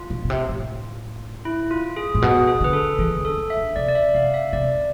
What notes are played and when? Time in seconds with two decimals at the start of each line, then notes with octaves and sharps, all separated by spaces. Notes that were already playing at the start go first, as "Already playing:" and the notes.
Already playing: F4
0.10 B2
0.25 B2
0.30 C3
0.49 A2
1.45 E4
1.71 F4
1.96 G#4
2.15 A2
2.22 B2 G#4
2.48 G#4
2.61 D3 B4
2.73 A4
2.99 E3 G#4
3.18 D3
3.25 A4
3.38 E3
3.50 E5
3.57 D3
3.76 C3 D5
3.89 D5
3.95 E5
4.14 C3 F5
4.34 E5
4.53 C3 D5